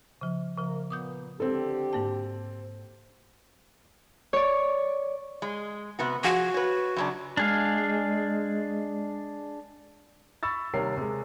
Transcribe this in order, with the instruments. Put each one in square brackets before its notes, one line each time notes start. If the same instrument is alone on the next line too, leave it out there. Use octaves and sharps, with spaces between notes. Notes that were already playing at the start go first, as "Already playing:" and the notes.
[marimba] C#3 F3
[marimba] C#3 F3 [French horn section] A#3 A#4
[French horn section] A#2 B3 [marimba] D6 D#6 G6
[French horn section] D3 G4 [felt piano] C4 A4
[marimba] G#2 A#3 A5
[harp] C#5 D5
[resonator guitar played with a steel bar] G#3
C3 B3 F#4
[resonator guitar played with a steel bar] F3 G#4 F#5 [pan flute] F#4
[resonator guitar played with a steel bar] B4 C#5
F#2 C#3 D4
[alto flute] G#3 [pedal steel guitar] D4 G#4 F5
[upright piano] B5 C#6 E6 A6
D#2 C3 G3 A#4 C#5 C7
C3 G#3